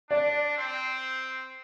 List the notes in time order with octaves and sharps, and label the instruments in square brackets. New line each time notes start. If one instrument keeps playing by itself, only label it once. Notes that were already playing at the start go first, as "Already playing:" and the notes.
[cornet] D4 [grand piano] D5
[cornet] C4